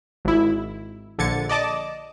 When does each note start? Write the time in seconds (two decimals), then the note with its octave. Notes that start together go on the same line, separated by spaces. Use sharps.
0.25 G#1 E4
1.18 A#1 D3 G#6 A6 C#7
1.49 D5 D#5 A5 D6